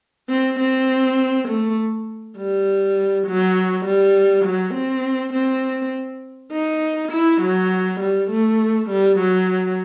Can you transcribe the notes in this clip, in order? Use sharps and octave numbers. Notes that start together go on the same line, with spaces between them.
C4
C4
A3
G3
F#3
G3
F#3
C4
C4
D#4
E4
F#3
G3
A3
G3
F#3